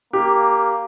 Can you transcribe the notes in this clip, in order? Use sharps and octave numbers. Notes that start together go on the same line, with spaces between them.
A#3 G4